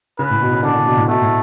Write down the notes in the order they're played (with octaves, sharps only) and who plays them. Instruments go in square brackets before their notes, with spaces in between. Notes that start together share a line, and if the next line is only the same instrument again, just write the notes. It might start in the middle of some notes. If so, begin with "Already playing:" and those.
[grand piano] C#3 [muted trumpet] B4
[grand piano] A2
B2
C#3
[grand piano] D3 [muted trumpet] D4
[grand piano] D3
B2
A2
[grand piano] B2 [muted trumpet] A3
[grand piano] A2